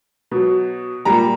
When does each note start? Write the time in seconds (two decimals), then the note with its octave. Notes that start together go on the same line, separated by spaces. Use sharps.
0.31 B2 F#3
1.05 A#2 G3 A#5